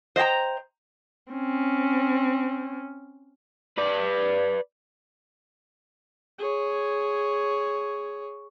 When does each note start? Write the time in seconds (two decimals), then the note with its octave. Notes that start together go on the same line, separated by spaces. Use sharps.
0.16 C5 D#5 F5 G5 A#5
1.32 C4 C#4
3.78 B4 D5
6.38 G#4 C#5